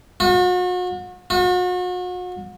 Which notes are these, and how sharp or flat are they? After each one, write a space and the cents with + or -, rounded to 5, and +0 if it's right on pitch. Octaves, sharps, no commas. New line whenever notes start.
F#4 -40
F#4 -40